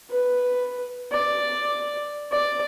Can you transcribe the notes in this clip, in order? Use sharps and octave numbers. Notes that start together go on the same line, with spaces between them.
B4
D5
D5